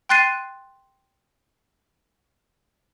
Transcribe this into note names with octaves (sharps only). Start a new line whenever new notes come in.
G5 C6 F#6 A6 C7 D#7